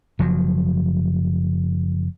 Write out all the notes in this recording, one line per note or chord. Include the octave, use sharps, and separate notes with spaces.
F#1 F3 F#3